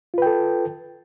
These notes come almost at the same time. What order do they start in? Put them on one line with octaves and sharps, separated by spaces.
F4 B4 G5 A4